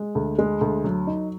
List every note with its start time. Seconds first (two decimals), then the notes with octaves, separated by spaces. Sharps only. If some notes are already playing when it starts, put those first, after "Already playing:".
Already playing: G#3
0.15 D2
0.39 G#3
0.61 D2
0.84 F#3
1.07 D#4